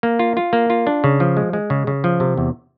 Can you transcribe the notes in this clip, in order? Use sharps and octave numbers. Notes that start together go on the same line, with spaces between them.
A#3
F4
F4
A#3
F4
D4
C#3
F3
G#3
G#3
C#3
C#3
F3
C3
E2